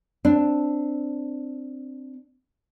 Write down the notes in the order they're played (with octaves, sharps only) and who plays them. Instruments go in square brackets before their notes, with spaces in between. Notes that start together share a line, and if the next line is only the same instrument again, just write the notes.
[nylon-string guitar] C4 D4